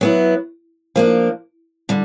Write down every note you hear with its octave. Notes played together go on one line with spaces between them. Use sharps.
F#3 B3 E4
F3 A#3 D4
D3 G3